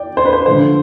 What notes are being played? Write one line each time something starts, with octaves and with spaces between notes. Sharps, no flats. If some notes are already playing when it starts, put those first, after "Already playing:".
Already playing: D5 G5
C5
B4
C5
D3 F3 A3 C5